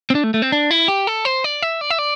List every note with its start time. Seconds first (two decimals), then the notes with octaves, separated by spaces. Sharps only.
0.10 C4
0.15 D4
0.24 A3
0.34 A3
0.42 C4
0.52 D4
0.71 E4
0.88 G4
1.07 A4
1.25 C5
1.44 D5
1.63 E5
1.81 D5
1.90 E5
1.98 D5